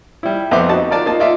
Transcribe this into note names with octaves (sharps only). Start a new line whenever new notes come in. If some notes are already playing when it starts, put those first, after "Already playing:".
G3 E4
F2 B3 C4 E5 C6 D6
D#4 F#4 A5
F4 A#4 D5 A5
A#3 D#4 F4 A5
D#4 F4 D5 E5